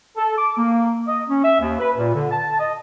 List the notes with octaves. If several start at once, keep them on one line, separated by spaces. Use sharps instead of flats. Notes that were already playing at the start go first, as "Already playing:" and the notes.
A4
D6
A#3
D#5
C#4
E5
D#2
B4
A#2
D3
A5
D#5